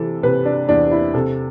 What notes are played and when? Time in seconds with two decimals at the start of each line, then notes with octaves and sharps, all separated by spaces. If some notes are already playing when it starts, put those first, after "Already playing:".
Already playing: C3 E3 A4
0.23 C3 B4
0.45 D4
0.69 E2 D4
0.91 E4
1.14 C3 A4